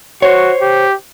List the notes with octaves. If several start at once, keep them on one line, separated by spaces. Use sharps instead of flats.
F#4 C5 C#5
G4